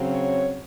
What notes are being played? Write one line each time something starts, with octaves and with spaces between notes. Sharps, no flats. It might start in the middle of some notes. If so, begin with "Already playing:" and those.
Already playing: C#3 F#3 C4
C#5